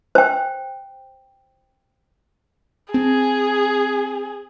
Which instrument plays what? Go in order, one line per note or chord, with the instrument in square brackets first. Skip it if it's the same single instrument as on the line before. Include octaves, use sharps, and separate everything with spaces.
[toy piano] C5 G5
[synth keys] C4 A5 [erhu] G#4